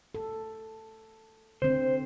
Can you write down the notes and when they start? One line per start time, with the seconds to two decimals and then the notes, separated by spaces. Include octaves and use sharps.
0.15 A4
1.62 D3 C4 C5